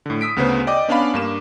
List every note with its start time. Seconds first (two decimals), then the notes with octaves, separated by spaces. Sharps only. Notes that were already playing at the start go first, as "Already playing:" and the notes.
0.06 A2 D3
0.21 D#6 E6 B6 D7
0.36 D2 C#3 B3 G#4 B4 C5
0.67 D5 D#5 G5 D6
0.88 B3 C#4 D4 D5 F5 B5
1.14 G2 A#3 E7